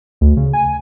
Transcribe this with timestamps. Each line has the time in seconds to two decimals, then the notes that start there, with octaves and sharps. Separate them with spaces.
0.21 D2
0.37 C#3
0.53 G#5